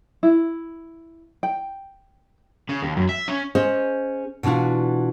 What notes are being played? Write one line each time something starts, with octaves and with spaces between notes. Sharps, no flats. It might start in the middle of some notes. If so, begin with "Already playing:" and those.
E4
G5
C#3
D#2
F#2
E5
C#4
C#4 G#4 C5 D#5
B2 E3 D4 F4 F#4